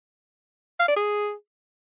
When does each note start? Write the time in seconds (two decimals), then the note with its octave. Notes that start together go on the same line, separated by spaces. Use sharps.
0.80 F5
0.88 D5
0.97 G#4